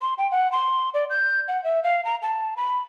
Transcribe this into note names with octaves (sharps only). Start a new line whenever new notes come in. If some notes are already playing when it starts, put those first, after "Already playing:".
C6
G5
F#5
C6
D5
G6
F#5
E5
F5
A#5
A5
B5